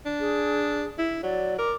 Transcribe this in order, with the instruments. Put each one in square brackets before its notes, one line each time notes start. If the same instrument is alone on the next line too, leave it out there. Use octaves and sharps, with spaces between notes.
[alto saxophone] D4
[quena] G#4
[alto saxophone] E4
[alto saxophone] F#3 [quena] D5
[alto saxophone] A#4 [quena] D6